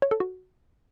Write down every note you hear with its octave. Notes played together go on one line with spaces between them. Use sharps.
C#5
A4
F#4